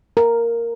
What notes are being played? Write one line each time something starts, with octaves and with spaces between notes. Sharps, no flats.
A#4